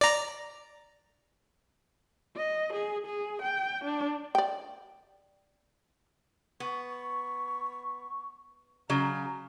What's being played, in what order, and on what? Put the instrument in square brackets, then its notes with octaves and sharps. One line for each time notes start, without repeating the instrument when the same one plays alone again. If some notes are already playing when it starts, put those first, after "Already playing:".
[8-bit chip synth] D5 A#5
[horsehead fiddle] D#5
G#4
G#4
G5
D4
[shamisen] D5 G5
[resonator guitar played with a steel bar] B3 [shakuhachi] C#6
[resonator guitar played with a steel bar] C#3 F#3 [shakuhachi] A#5